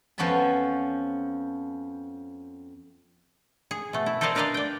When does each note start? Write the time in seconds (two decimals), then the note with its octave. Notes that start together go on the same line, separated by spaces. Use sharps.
0.18 F2 F3 B3 C#4 B4 A5
3.71 G#4
3.93 B2 A3
4.06 E4
4.21 A4 A#4 C5 D5 D#5 F5
4.35 D4 A#4 B4 D5 D#5 F5
4.54 D5 G5